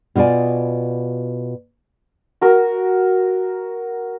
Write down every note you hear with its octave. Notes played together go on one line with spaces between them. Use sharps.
B2 F4 F#4 D5 G#5
F#4 A#4